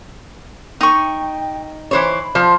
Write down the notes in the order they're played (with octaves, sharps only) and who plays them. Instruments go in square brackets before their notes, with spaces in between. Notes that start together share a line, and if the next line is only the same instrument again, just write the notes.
[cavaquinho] D#4 C#6 [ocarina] G5
[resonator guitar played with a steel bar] E3 C5 C#5 [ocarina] B5
[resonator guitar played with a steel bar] F3 C5